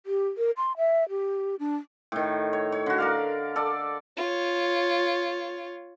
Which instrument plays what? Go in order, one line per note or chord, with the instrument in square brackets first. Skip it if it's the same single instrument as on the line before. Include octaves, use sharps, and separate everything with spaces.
[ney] G4
A#4
C6
E5
G4
D4
[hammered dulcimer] A2 D#3
C#5
C#5
D3 F#4
A#4 D5 F5
A4 D5
[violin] F4 C#5